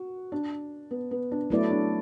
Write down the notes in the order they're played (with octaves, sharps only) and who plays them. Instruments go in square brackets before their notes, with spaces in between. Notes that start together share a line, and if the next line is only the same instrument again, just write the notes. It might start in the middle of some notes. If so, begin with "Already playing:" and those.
Already playing: [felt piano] F#4
D4
B3
B3
D4
[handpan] F#3 A3 E4 D5 [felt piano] B3
[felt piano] D4